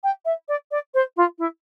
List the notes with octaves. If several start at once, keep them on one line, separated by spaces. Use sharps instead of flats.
G5
E5
D5
D5
C5
F4
E4